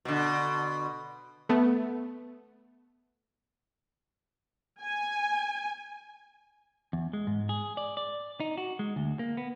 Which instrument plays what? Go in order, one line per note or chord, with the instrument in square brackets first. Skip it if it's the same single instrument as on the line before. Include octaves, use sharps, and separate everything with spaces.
[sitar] B2 D3
[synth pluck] A3 B3
[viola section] G#5
[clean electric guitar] E2
G#3
G#2
G#4
D5
D5
D#4
F#4
G#3
D2
A#3
B3